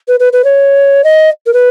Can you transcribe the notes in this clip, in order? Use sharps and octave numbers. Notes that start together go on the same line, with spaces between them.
B4
B4
B4
C#5
D#5
A#4
B4